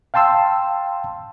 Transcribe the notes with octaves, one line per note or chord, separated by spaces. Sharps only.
F5 G5 A5 C6 E6